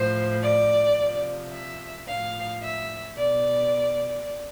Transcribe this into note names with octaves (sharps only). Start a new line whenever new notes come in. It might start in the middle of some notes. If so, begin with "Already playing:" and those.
Already playing: A2 F3 C5
D5
C3 F3
E5
A2 F3 F5
E5
B2 D5